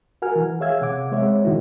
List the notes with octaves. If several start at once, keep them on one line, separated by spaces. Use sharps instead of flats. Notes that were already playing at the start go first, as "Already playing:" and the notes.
F#4 A#4 F#5 G#5 F6
E3
G#4 C#5 E5 F5 E6 G#6
C3 F#5 D6
G#3 C4 C#5 E5
G#2 D3 D#3 A#3 E4 F#4